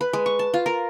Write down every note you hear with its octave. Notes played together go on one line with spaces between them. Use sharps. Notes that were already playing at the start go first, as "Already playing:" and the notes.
B4
G#3
C#6
A5
F4
A#4